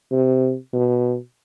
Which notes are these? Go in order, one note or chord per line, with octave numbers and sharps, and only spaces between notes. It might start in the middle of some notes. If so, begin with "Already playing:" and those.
C3
B2